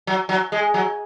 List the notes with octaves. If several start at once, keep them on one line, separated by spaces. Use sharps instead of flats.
F#3
F#3
G#3
F#3